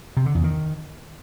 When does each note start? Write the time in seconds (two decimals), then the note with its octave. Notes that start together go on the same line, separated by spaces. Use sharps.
0.17 C3
0.26 D3
0.35 E2
0.44 D#3